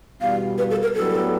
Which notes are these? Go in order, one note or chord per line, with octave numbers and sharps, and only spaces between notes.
E2 B2 G3 F5
B4
A4
A#4
A2 F#3 B3 D4 G4 A4